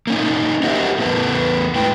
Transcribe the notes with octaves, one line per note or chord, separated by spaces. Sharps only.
A#3 C#4 D#4
G4 A#4 C5 D#5 E5 F#5
E2 A3 B3 A#4 B4 A5
A2 G#3 E4 B4 G5